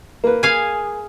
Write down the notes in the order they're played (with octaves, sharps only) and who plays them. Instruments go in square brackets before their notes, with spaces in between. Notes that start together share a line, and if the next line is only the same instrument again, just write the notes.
[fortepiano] A#3 B4
[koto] G#4 F5 G#5